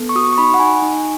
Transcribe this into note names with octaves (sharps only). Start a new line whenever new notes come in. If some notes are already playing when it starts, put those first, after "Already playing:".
Already playing: B3 A4
C#6
F#4 D#6
C#6
D#4 B5
F#5
D#4 G#5
D#4